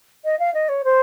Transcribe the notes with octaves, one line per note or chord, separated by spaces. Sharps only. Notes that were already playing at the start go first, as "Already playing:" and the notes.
D#5
F5
D#5
C#5
C5